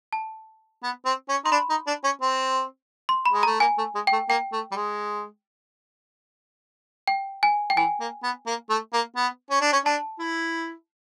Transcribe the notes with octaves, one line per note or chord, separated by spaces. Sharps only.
A5
B3
C4
C#4
D#4 C6
D4 B5
D#4
D4
C#4
C4
C6
B5
G#3
A#5
A3
A#3 G#5
A3
G#3
G5
A3
A#3 G5
A3
G3
G#3
G5
G#5
G5
E3 G#5
A#3
B3
A#3
A3
A#3
B3
C#4
D4
C#4
D4 A5
E4